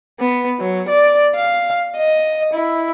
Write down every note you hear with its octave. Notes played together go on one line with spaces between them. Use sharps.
B3
F#3
D5
F5
D#5
E4